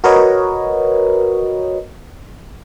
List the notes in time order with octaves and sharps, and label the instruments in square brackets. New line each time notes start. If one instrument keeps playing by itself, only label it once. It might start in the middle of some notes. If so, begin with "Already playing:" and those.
[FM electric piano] F#4 A#4 B4 C#5 D#5